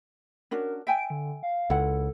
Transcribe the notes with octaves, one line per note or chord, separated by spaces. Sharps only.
C#4 D4 F#4 A#4
E5 G5 G#5 D7
D3
F5
C#2 E4 A4 F#5